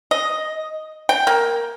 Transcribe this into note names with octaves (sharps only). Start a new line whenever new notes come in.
D#5
G5
A#3